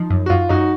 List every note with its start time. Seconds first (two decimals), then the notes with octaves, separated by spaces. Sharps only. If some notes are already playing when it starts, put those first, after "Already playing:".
Already playing: F3 D#4
0.10 F#2
0.26 F#4
0.30 F#2 F4
0.49 F#2 D#4 F#4